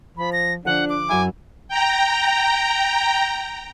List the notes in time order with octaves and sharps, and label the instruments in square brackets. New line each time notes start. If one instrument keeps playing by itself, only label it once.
[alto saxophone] F3 [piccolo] B5
[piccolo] A#6
[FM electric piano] D3 F3 F#6 [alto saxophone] D4 [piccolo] F#5
[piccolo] D6
[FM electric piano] F#2 F#3 E4 [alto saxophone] G#5
[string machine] G5 A#5